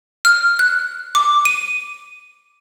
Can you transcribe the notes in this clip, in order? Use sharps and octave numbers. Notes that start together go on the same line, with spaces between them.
F6
F#6
D6
D#7